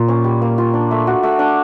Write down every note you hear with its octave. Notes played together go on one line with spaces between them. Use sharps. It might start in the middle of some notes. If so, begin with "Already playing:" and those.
Already playing: A#2 A#3 F4
C#4
G3
A#3
F4
D4
A3
F#4
A3
D4